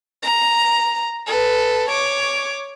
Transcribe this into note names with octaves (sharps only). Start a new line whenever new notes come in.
A#5
A4 B4
C#5 D6